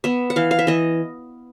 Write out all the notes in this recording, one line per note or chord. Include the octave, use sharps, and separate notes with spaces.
B3 E5
F#5
E3 F5
F5
E5
E3 D#5